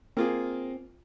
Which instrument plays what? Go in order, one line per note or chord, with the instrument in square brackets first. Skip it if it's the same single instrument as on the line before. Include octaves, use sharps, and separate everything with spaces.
[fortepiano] A#3 F4 G#4 [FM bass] C4